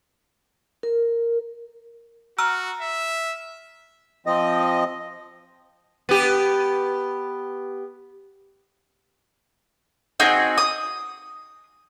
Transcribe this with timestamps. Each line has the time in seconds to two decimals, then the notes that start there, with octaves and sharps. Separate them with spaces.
0.83 A#4
2.38 F#4 A#5 E6 F6
2.81 E5
4.26 F3 C4 D#5
6.09 B3 G4
10.20 C4 D#4 F#4 G#4
10.58 D#6